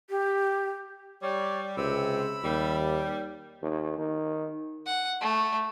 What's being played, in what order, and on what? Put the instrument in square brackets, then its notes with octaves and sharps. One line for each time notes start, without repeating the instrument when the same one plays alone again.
[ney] G4
[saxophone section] G3 [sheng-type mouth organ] C#5 D5
[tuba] C#2 [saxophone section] C3 [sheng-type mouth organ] B5 E6
[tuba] D#2 [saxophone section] G3
[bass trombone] D#2
D#3
[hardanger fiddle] F#5
A3